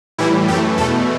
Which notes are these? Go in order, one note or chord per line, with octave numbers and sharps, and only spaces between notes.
A2 E3 G3 E4
F#2 E3 A3 G4
E2 B2 A3 A4